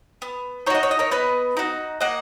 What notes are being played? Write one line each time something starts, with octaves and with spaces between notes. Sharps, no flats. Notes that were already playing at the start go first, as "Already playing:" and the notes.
B3
D#4 F#4 C#5 D#5
C#5
D#5
A#4 C#5
B3 B4 D#5
D#4 F#4
A#3 D#5 F#5